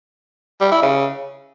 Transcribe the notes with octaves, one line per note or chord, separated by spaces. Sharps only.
G3
E4
C#3